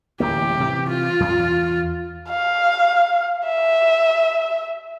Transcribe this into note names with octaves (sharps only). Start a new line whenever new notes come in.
D1 A1 A#3 G4
C3 E3
F4
E2
F5
E5